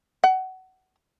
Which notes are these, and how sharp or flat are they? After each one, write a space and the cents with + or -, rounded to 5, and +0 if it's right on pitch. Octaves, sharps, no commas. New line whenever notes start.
F#5 +25